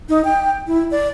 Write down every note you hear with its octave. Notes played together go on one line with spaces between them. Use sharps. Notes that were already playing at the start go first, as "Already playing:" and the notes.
D#4
G5
E4
D5